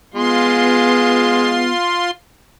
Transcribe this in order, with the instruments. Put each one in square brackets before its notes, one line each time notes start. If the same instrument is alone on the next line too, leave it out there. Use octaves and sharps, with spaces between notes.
[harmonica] G#3 [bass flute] B3 [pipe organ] F4 C6